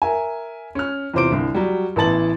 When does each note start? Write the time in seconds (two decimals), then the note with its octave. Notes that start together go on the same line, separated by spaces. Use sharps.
0.02 A#4 E5 G#5
0.75 C#4 F6
1.14 E2 C3 F4 C5 D6 D7
1.31 C2 D3
1.54 F#3 G3
1.96 A1 E3 B3 A5 A6 F#7